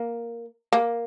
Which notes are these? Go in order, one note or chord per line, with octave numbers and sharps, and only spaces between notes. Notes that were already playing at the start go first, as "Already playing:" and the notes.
Already playing: A#3
A#3